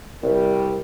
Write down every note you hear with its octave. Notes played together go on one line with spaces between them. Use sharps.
C2 G3 A#4